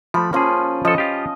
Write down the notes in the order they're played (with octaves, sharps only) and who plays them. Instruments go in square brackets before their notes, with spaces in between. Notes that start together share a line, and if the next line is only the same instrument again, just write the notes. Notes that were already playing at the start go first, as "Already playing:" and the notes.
[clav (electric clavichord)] F3 A3 [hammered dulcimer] B5
[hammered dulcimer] F3 C#4 [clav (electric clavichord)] A#3 G#4
[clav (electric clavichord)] F3 A4 [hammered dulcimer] D#5
[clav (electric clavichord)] F4 G4